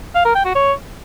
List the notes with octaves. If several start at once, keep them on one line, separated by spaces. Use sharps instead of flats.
F5
A#4
G5
F#4
C#5